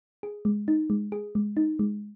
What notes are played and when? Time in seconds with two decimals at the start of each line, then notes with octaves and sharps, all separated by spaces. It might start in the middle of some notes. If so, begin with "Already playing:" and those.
0.23 G#4
0.45 G#3
0.68 D#4
0.90 G#3
1.12 G#4
1.35 G#3
1.57 D#4
1.79 G#3